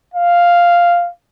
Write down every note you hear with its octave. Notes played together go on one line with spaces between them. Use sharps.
F5